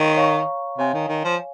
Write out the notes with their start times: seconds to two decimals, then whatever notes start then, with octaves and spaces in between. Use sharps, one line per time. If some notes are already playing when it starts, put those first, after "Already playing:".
Already playing: D#3 C#5 F5 C#6
0.17 C#5 F5 A#5 C#6
0.78 C3 C#5 F5 G#5
0.94 D#3
1.09 D#3
1.24 F3